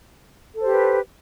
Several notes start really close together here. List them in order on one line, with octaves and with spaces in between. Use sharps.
A4 C5 G4 B4